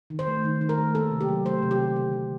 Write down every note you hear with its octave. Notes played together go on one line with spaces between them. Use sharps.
D#3
C5
A3
D#3
D#3
A#4
A3
A#3 A4
C3
G4
F#3
A3 C5
C3
G4
D#3
D3
D3